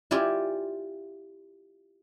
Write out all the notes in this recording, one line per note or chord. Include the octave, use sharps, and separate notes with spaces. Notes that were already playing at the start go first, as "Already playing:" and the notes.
E4 F4 G4 D5 G#5